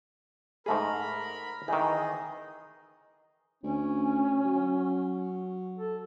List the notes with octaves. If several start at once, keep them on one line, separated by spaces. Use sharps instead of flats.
G#2 A3 G#4 A#4 B5
D#3 E3 D#4 G#4 D#5
D2 C#4
F#3
A4